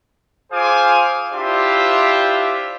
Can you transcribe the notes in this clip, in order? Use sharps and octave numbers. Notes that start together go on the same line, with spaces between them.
F4 G#4 C5 F5 G#5 D6
D4 E4 F4 G4 C5 E5